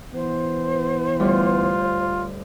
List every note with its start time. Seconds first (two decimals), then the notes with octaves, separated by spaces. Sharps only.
0.14 E3 B3 C5
1.20 D2 G3 F4 C#5